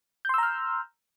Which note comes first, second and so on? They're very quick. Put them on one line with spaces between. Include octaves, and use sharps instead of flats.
G6 C6 E6 A#5 F6